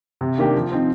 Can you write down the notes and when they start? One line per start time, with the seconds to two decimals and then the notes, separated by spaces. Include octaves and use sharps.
0.21 C3
0.38 D#3 A#3 D4 G4
0.54 F3
0.72 C4 D#4